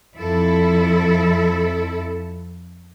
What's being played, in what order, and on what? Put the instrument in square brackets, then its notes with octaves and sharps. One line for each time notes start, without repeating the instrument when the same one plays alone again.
[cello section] F2 E4 A4